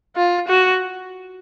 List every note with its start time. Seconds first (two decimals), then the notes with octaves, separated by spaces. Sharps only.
0.16 F4
0.48 F#4